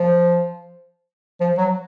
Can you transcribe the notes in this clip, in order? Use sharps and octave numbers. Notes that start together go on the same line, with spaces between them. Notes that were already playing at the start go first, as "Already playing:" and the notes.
Already playing: F3
F3
F#3